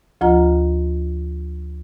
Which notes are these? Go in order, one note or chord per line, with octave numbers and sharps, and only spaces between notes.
D2 F3 F4 D#5 A#5